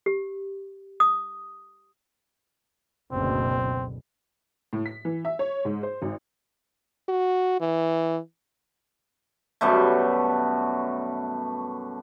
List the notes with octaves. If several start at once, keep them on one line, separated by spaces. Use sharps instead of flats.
G4
D#6
F#1 D2 B2 C4
A2
B6
E3
E5
C#5
G#2
C5
G#1
F#4
E3
F#2 B2 G3 A3